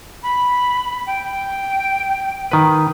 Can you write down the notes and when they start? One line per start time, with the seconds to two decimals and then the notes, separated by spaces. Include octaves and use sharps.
0.23 B5
1.06 G5
2.51 D#3 B4